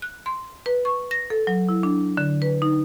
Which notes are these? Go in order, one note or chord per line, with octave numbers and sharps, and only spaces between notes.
F#6
C6
B4
C#6
A#6
A4
F#3
E4
D4
D3
B4
D#4